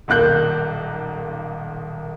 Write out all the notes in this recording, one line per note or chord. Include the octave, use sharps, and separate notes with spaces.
D#1 B1 A#3 F#6 G6